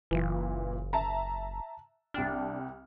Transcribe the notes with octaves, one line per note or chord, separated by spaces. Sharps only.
F#1 A#2 E3
E5 A5 A#5
C2 D4 G5 F6